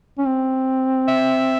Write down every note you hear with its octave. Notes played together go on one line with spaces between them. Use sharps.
C#4
C4
E5